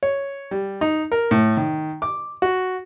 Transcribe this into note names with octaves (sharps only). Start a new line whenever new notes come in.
C#5
G3
D#4
A#4
A2
D#3
D6
F#4